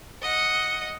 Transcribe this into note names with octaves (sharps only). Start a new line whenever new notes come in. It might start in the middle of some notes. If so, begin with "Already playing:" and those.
D#5 F#5